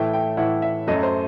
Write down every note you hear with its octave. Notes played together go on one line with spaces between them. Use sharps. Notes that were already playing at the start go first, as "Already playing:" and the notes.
Already playing: A2 E3 A3 E4 G5
G5
A2 E3 A3 E4 F#5
E5
F#2 F#3 A3 D#5
C5